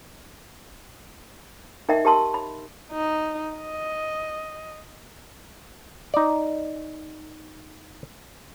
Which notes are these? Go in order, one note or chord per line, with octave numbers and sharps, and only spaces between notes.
D#4 A#4 D#5 E5 G5
G4 A#4 A5 C6 E6
B5
D#4
D#5
D#4 D5